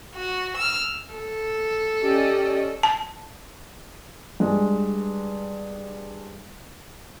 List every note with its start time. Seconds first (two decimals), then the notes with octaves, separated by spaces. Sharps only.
0.15 F#4
0.57 E6 F6
1.13 A4
2.01 C#4 G4 D5 D#5
2.83 A5
4.40 G2 G#3